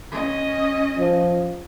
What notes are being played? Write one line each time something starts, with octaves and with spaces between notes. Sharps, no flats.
C#4 D#5
F3